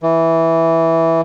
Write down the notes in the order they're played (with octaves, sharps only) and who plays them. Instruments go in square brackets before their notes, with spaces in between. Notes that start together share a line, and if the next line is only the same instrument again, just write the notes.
[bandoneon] E3